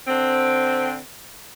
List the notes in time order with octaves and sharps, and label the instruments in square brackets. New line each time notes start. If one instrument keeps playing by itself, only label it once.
[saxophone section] D3 C4